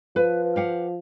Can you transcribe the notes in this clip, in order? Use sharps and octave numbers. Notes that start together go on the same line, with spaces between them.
F3 B4
G4 F5 F#5